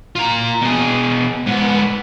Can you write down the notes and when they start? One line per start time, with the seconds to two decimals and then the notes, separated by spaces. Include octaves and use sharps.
0.15 F4 A#5
0.61 B2 G#4
1.47 G#2 B3